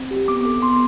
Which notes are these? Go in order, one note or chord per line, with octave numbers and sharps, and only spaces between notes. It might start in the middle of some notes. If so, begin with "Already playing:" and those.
Already playing: C4
G4
B3 D6
A4
B3 C6